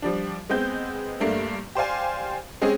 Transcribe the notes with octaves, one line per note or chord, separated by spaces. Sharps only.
F3 G3 D4
G#3 B3 C4 G6
G2 A3 A#3 D4
G4 C5 D5 F5 G#5
G#3 C4 C#4 G4 G#4